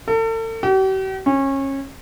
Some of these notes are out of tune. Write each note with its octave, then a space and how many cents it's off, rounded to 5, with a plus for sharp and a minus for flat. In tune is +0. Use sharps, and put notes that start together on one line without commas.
A4 +40
G4 -45
C#4 -25